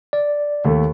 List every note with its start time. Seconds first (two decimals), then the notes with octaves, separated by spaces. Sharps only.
0.13 D5
0.65 D#2 A3